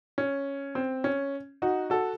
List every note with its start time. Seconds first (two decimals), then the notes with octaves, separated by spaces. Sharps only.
0.18 C#4
0.75 C4
1.04 C#4
1.62 D#4 F#4
1.90 F#4 A4